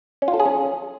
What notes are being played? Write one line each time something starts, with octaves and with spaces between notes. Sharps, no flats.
C#4
F4
A4
G#4
C#4